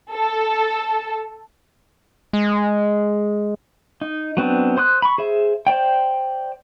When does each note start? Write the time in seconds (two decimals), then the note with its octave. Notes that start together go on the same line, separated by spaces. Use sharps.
0.13 A4
2.33 G#3
4.01 D#4
4.37 F#3 B3 C4 D4
4.77 C5 C6 D#6 F#6
5.02 B5 C#6
5.18 G#4 C5 E5
5.67 C5 D5 G5